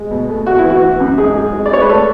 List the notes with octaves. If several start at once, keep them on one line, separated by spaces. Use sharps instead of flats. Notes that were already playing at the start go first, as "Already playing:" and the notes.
Already playing: G#3
B2
A3
E2 F#4
E4
E3
F#4
E3
F#2
G#2 G#4
G#3
G#3
D5
G#3 C#5
B4
A3 A4